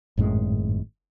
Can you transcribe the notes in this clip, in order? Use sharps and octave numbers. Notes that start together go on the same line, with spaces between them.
G#1 F#2 A2 G#3